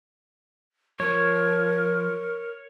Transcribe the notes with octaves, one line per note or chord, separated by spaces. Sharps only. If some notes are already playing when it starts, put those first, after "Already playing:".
F3 A#4 C#5